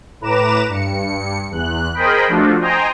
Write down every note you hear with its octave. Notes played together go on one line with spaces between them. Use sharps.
A2 B4 A#5 D6 E7
G2 C#7
E2 F#6
G#4 A#4 C5 D#5 G5 B5
F3 A3 D4 F4 F#4
C5 D#5 G5 G#5 A#5